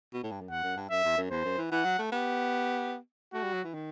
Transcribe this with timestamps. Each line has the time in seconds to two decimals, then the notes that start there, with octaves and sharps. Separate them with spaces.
0.13 B2
0.23 A2
0.31 G2
0.41 F#2
0.50 E2 F#5
0.63 F#2
0.77 G2
0.90 F#2 E5
1.04 E2
1.17 F#2
1.31 E2 C5
1.45 F#2
1.58 E3
1.71 E3 F#5
1.84 F#3
1.98 A3
2.12 B3 G4
3.33 A3 F#4
3.43 G3
3.53 F#3
3.64 E3
3.74 D#3